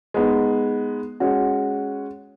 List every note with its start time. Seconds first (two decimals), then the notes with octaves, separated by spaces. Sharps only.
0.14 G#3 B3 D#4
1.20 G#3 C#4 F#4